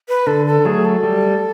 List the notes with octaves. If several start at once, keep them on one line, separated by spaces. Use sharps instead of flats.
B4
D3 A4
A4
F#3 A3 G#4
A4
G3